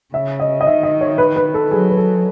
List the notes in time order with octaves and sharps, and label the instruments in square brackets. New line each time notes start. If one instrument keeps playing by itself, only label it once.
[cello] C#3 [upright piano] E5
[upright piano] D#5
D#5
[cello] D#3 [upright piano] E5
[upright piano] D#5
C#5
B4
B4
A4
[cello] F#3 [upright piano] G#4
[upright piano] B4
A4